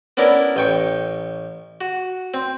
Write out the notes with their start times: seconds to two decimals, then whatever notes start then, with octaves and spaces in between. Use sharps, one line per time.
0.17 B3 C#4 D4 E4 A#4
0.56 A1 G5 C#6
1.81 F#4
2.34 C4